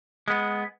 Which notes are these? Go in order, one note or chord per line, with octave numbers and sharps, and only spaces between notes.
G#3 B3